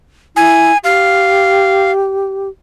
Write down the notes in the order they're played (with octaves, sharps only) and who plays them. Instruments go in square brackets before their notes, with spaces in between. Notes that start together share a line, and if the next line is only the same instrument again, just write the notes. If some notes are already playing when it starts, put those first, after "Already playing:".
[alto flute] E4 [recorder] G#5
[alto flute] G4 [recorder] F5